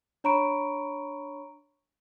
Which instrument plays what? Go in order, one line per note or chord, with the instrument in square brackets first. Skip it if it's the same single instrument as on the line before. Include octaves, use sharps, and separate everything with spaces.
[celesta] D4 C#5 A#5 B5 C#6 D7